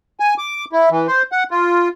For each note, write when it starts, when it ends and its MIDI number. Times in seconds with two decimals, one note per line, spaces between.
0.20 0.34 80
0.38 0.65 86
0.73 0.89 64
0.90 1.07 52
1.08 1.22 72
1.32 1.44 78
1.51 1.88 65